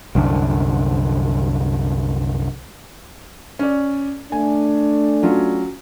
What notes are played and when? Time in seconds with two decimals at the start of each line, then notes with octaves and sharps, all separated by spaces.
0.15 C2 F#2 D3
3.59 C#4 D5
4.32 A3 D4 G#5
5.23 F#3 C#4 F4